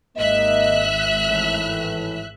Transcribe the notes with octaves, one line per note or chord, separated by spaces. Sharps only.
G#1 D#2 A#3 D#5 E5 F#6
A2 E3